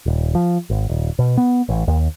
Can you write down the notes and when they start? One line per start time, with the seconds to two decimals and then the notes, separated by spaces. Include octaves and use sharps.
0.06 D#1
0.35 F3
0.70 G#1
0.89 D#1
1.19 B2
1.37 B3
1.69 A1
1.88 D#2